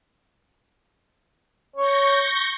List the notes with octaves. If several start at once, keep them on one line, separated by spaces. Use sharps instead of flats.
C#5 C#6 G6 A#6